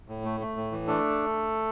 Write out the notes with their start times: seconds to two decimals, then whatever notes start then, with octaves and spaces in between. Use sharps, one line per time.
0.08 A2
0.25 A3
0.40 A3
0.56 A2
0.72 E3
0.87 A3 D4 A4